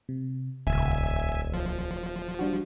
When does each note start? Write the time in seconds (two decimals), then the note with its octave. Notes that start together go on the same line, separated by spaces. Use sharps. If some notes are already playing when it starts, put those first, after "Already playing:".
0.09 C3
0.67 D#1 C#2 E5 G#5
1.54 F3
2.39 G3 D4 F#4